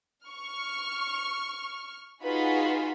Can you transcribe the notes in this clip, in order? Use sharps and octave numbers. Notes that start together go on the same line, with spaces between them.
C#6 F6
D#4 F4 F#4 G#4 B4 B5